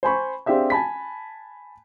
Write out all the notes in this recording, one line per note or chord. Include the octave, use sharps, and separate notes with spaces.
C5 G#5 B5 C#6
C4 D4 G4 G#4 E5 F5
G#5 A5 B5 B6